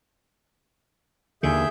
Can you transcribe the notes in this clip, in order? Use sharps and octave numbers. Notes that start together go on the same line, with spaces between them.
D#2 D3 G#4 E5 G6